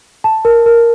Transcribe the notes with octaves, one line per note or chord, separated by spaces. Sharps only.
A5
A#4
A#4